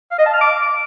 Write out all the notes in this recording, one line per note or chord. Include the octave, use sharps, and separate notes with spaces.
F5
D#5
A5
F6
D6